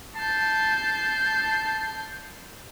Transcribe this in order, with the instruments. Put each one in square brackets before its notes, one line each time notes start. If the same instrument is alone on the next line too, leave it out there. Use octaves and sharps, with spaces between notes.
[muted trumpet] A5 [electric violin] G6 C7